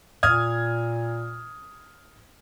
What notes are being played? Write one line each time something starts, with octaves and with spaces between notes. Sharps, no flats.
A#2 D#6 F6 G#6